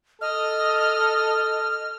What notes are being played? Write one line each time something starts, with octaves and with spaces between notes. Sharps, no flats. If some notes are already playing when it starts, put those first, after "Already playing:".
A4 D#5 F6